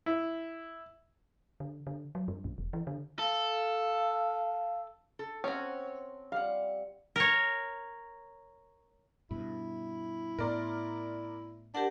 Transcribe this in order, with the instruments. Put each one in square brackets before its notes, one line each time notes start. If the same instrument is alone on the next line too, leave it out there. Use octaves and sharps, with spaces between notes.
[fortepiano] E4
[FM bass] D3
D3
F#3
G2
B1
E1
E3
D3
[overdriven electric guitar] A4 [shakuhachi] F5
[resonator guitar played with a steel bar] A4
[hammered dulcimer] C4 [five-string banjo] C#4 F#4 [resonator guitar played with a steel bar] C#5
[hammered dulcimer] G3 [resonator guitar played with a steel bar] F5 F#5
[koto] A#4 C#5
[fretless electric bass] G2 B2 [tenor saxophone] E4
[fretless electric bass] A2 B3 [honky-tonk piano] A#4 D5 C6
[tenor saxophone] D4 [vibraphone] G4 A#4 F#5